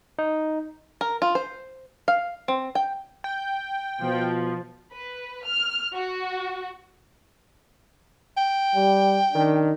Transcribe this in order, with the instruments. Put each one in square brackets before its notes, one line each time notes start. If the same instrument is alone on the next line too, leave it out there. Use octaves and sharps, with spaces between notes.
[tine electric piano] D#4
[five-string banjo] A#4
F4
C5
F5
C4
G5
[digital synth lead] G5
[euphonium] B2 [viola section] F3
[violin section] B4
F6
F#4
[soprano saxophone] G5
[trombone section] G3
D#3 D4